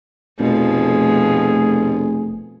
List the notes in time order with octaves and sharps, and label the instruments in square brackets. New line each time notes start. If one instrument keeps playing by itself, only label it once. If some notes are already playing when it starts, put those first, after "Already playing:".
[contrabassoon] F1 [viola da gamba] B2 F3 [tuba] A3 [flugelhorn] G#4